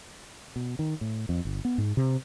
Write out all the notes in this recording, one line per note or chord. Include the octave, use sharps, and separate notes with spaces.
B2
D#3
A2
F2
G1
B3
G#2
C3